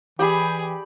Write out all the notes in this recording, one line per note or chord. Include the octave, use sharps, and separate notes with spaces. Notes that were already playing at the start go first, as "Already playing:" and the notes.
E3 G4 G#4 D5 B5